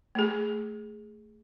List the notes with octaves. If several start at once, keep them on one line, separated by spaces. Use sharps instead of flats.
A3 G#4